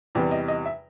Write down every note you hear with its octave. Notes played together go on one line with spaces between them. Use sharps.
E2 C3 E3 G3
D#5
D#5
E5